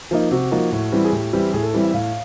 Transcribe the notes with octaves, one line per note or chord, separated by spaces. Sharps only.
F3 A#3 D#4
C3 F#4
F3 A#3 D#4
A2
E3 G3 C4 E4
G#4
A2 G4
E3 G3 C4 E4 G4
A2 G#4
A4
E3 G3 C4 E4
E5
A2 F5